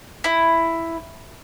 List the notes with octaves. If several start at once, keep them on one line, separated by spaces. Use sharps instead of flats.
E4